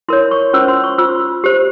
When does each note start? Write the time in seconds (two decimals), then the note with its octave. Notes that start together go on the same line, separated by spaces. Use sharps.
0.09 E4 A#4 C#5 C6
0.31 C#6
0.53 C#4 F4 C5 E6
0.68 C6
0.84 C#6
0.98 F4 C5 E6
1.44 G4 C5